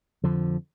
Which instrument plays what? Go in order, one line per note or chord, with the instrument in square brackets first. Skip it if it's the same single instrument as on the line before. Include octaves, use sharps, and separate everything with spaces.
[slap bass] F2 D3 F3